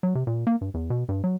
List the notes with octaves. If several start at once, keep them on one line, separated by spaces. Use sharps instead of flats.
F#3
C3
A#2
A#3
G2
E2
B2
G2
F#3